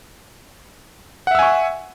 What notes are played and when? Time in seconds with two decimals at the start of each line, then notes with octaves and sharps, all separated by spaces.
1.27 F#5
1.31 E5
1.35 E6
1.39 G#5
1.43 C#6